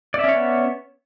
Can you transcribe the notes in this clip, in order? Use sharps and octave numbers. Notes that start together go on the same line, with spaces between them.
B3 C#4 C#5 D5 E5